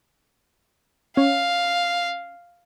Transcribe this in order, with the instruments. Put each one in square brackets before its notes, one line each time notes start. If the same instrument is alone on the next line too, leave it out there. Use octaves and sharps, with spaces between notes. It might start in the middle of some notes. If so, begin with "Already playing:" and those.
[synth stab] C#4 [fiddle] F5